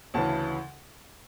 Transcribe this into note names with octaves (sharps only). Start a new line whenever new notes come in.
D2 C#3 E3 A5